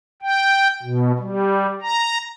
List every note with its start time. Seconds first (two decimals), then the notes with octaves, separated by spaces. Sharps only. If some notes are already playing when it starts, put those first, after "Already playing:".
0.22 G5
0.83 B2
1.19 G3
1.82 A#5